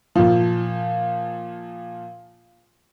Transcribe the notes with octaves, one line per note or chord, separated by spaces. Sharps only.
A#2 F3